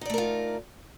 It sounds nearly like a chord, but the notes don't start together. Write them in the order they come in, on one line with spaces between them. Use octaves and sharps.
D#4 D5 A3 A#4 F4